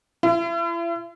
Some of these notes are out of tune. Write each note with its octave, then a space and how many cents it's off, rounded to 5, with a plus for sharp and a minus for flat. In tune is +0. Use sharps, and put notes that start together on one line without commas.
E4 +45